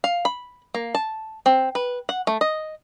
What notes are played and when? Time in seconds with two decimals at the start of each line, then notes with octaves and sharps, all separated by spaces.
0.04 F5
0.25 B5
0.74 A#3
0.95 A5
1.46 C4
1.75 B4
2.09 F#5
2.27 A3
2.41 D#5